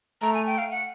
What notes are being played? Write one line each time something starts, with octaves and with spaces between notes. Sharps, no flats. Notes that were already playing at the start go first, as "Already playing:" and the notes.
A3 A#5
G#5
G5
F5
F#5